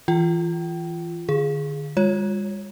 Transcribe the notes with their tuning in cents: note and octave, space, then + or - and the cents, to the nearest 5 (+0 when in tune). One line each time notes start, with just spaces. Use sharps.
E3 +0 F4 -15 G5 -30
D3 +35 G#4 +0
G#3 -45 F4 +30 C#5 +0